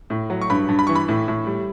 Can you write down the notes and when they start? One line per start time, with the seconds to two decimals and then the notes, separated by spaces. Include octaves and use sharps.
0.10 A2
0.30 F#3
0.41 C#6
0.50 G2 B5
0.69 G2
0.79 B5
0.87 E3 C#6
0.95 B5
1.08 A2
1.28 A2
1.46 G3